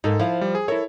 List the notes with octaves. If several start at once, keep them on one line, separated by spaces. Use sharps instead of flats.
G#2 A#3 D#4 A4
F3 E4 F5 A5
G3
G#4
E4 A4 A#4 C#5 E5